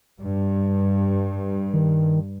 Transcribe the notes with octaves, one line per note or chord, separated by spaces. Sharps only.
G2
D#3